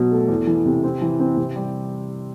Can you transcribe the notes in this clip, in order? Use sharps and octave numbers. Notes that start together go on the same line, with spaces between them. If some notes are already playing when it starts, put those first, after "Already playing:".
Already playing: B2 F#3
A3
E2
E3
C3
C4
E3
C4
C3
G3